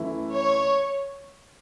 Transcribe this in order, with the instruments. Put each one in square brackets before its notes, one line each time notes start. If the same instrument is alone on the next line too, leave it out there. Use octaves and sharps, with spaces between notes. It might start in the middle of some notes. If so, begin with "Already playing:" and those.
Already playing: [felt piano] F#2 E3 A3 E4
[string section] C#5